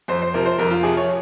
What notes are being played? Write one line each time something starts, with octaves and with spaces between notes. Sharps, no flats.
F2 C5
C5
C3 F3 A#4
C5
F2 A#4
F4
C3 F3 G#4
C#5